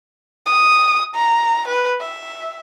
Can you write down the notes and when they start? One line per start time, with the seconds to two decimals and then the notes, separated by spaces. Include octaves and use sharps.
0.46 D#6
1.15 A#5
1.68 B4
2.00 E5